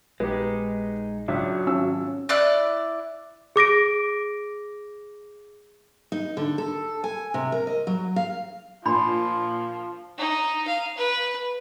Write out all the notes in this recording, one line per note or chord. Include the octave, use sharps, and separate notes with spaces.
A#1 G#3 B3 D#4 G4
C#2 F#3 D4 E5
G#1 F3 C#4 E6
E4 D5 F#6
G#4 D6 A#6 D7
D#4
D3
A4
G#5
C3
A#4
D#5
F#3
F5
A#2 F3 D4 B5 C6
D#4
F5
B4